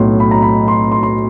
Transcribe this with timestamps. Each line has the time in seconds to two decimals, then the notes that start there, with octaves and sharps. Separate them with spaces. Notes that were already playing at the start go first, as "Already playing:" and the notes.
Already playing: B1 A2 F#3 C6
0.20 B5
0.31 A#5
0.43 B5
0.68 C6
0.92 C6
1.03 C6